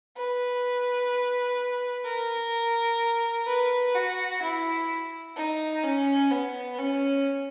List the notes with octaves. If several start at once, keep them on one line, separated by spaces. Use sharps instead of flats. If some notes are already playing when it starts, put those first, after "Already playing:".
B4
A#4
B4
F#4
E4
D#4
C#4
B3
C#4